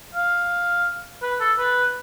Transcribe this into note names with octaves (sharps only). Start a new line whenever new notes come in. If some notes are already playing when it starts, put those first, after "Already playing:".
F5
B4
A4
B4